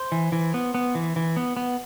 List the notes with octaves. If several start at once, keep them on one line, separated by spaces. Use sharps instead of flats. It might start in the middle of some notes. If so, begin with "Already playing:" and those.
Already playing: C5
E3
E3
B3
B3
E3
E3
B3
B3